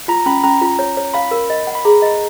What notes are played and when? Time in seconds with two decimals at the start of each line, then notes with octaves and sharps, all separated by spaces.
0.08 F4 A#5
0.26 C#4 B5
0.44 C#4 A#5
0.61 F4
0.79 C#5
0.97 C#5
1.14 F5 B5
1.31 A#4
1.50 D#5
1.67 F#5
1.75 B5
1.85 G#4 A#5
2.02 D#5